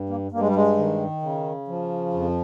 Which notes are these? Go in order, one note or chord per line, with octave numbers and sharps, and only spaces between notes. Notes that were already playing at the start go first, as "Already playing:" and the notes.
Already playing: G2
A#3
G2 A#3
G#3
G3
G#3
D#3
C#3
F3
F2